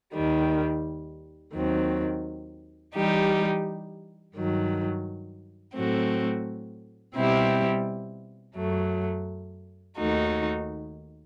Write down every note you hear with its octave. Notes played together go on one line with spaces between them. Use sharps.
D#2 D#3 G3
D#2 D#3 F#3 C4
E3 G3 D#4 G4
G2 D#3 F#3
A2 F#3 A3 C4 F#4
B2 G3 C4 E4 G4
F#2 F#3 A3
D#2 D#3 A3 D#4 F#4